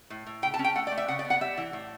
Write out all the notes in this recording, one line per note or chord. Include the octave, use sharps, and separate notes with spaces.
A2
A2
C#3 G5
A5
C#4
G5
A3 F#5
D5
A3
E5
C#3 F#5
D5
B3
F#5
G3 E5
E3
A2